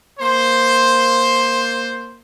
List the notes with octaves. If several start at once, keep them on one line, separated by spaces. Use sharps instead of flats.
A#3 C5